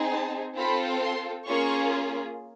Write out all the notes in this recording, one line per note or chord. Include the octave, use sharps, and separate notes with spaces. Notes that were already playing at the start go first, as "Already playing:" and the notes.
Already playing: C4 D#4 G#4
A5
C4 F4 A4 B5
C6
A#3 C#4 F4 G#4 C#6